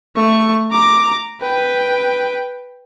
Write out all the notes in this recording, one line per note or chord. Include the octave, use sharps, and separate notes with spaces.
A3 C#6
A#5 D6
B4 G5